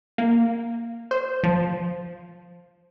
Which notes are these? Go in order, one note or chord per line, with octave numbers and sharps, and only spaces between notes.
A#3
C5
F3